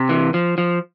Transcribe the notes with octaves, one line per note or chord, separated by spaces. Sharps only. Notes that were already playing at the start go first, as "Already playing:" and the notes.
Already playing: C3
E3
F3
F3